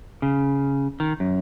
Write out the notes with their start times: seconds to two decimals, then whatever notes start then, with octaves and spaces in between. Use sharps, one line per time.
0.22 C#3
1.00 D#3
1.20 F#2